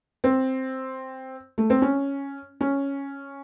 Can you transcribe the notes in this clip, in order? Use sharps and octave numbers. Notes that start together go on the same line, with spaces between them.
C4
A3
C4
C#4
C#4